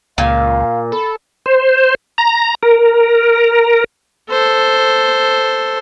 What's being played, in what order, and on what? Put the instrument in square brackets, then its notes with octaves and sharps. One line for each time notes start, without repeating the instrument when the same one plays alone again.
[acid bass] C#2 [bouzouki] A#2 [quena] F5
[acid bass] A4 [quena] B5
[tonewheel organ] C5
A#5
A#4
[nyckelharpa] A4 C5